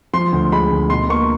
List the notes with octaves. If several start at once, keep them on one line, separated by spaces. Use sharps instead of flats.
F3 C6
D2
G#3 B5
D2
B2 C6
A#3 C#6